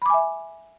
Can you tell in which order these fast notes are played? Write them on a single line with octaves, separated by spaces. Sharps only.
B5 D6 G#5 E5